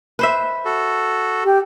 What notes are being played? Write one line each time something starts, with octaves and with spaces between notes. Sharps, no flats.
B4 C5 E5
F#4 A4
G4